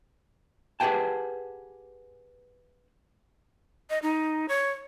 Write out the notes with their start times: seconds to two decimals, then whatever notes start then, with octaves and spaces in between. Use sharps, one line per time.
0.80 G4 G#4 B4 F#5 G5 A5
3.90 D#5
4.03 D#4
4.49 C#5